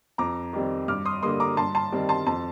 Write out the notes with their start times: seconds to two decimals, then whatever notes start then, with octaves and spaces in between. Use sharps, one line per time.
0.18 F2 A#5 D6
0.53 D#3 G3 C4
0.88 G2 D6 F6
1.05 C6 D#6
1.23 D3 G3 A#3 C6 D#6
1.40 A#5 D6
1.57 G2 A5 C6
1.75 A5 C6
1.92 D#3 G3 C4
2.09 A5 C6
2.26 F2 A5 C6